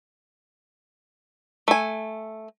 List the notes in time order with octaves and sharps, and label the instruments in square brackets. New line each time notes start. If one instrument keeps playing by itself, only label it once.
[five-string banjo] A3 G#5